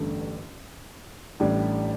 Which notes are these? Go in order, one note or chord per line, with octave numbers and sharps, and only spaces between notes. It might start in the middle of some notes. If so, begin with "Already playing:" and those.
Already playing: A1 G2 D3 A3
A1 A2 G3 D4